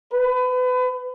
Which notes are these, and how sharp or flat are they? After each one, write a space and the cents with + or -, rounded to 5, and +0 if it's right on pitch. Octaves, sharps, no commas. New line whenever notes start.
B4 +30